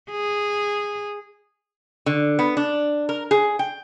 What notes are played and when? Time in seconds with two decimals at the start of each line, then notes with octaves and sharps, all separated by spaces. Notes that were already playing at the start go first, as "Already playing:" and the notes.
0.11 G#4
2.06 D3
2.39 B3
2.57 D4
3.09 A#4
3.31 G#4
3.59 G5